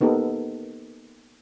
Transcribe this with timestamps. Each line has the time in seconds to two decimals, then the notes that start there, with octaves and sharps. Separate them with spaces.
0.01 A#3 B3 D#4 G4 A4 A#4